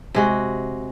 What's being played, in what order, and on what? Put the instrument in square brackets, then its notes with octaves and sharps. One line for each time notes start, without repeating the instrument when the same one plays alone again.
[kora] C3 G#3 F#4